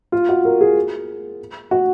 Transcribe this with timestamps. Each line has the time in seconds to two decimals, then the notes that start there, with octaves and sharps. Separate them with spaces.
0.12 F4
0.29 F#4
0.45 A#4
0.61 G#4
1.71 F#4